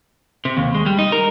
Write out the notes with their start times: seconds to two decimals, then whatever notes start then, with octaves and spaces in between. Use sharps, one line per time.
0.45 C3
0.57 D#2
0.75 G#3
0.86 G3
0.99 D#4
1.12 A#4